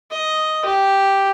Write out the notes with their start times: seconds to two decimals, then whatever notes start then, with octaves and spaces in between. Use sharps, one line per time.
0.11 D#5
0.65 G4